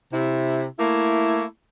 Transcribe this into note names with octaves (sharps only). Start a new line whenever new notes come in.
C3 E4
A3 A#3 E4